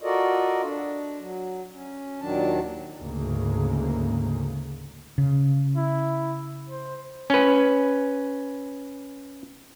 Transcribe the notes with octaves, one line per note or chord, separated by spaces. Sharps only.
F4 F#4 A4 A#4 D5 D#5
D4
F#3
C#4
D#2 A#2 D#3 F#3 D4 A5
D2 G#2 C#3 A#3
C#3
E4
C5
C#4 B4